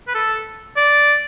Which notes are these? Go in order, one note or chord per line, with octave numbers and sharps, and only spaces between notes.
B4
A4
D5